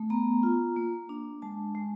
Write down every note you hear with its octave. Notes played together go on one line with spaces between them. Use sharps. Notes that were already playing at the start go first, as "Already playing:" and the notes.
Already playing: A3
B3 A#5
F4
A#3
D4
G#3 A5
G#3